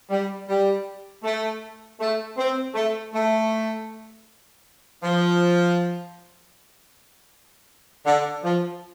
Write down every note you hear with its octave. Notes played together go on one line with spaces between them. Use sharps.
G3
G3
A3
A3
C4
A3
A3
F3
D3
F3